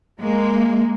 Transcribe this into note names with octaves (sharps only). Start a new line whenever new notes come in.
G#3 A#3